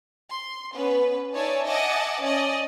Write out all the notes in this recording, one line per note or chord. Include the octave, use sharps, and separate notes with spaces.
C6
B3 C#4 B4
D#4 C#5 D5 E5 G#5 A5
D#5 E5 F#5 G#5 A5 D6
C#4 D5 D#5